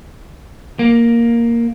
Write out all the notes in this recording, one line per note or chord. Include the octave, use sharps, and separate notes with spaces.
A#3